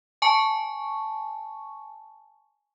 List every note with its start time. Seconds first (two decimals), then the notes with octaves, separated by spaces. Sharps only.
0.22 G#5 A5 C#6